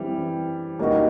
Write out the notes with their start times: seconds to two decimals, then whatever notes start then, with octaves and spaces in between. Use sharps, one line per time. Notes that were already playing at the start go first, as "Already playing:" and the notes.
Already playing: E3 G3 C4
0.79 G3 A#3 D#4 F#4